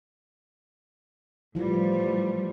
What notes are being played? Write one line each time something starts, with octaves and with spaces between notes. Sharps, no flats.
A2 E3 F3 G3